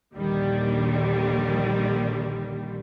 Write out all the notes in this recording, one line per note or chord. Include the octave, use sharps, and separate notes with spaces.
A#1 D#2 D3 D#3 G3